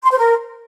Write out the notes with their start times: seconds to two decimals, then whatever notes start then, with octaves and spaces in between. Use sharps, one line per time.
0.04 C6
0.11 C5
0.18 A#4